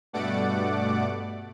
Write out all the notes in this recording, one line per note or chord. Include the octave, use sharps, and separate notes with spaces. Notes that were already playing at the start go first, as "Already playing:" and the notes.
G2 B2 A3 D5 F#5 D6